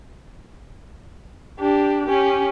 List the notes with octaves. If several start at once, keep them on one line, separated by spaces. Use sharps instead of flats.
D4 G4
C#4 G4